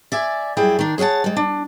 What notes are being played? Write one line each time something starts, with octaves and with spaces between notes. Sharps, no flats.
D5 E5 G#5
F#2 G3 E4 G#4 G5
D#3 D4
G#4 C#5 F5 F#5 A5
G3 G#3
D4